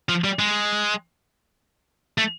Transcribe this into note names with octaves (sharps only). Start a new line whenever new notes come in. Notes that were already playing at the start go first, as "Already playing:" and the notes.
F3
G3
G#3
A3